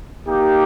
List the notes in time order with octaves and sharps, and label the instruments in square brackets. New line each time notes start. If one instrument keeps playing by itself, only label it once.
[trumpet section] A#3 D#4 G4